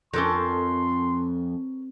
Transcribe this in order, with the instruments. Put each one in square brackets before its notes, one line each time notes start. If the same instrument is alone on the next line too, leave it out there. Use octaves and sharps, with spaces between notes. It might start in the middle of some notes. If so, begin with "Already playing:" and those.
[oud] F2 [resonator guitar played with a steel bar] C#4 A4 A#4 [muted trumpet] C6